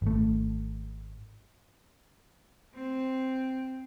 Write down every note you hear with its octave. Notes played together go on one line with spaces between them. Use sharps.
G#1 A3
C4